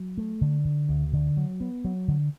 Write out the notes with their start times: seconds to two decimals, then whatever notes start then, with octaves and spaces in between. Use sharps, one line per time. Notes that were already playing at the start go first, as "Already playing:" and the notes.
Already playing: F#3
0.18 A3
0.41 D3
0.65 D3
0.89 D2
1.13 D3
1.37 F#3
1.60 B3
1.85 F#3
2.08 D3